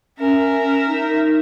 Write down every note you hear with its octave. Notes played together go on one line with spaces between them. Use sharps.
C#4 A#4 E5
D#4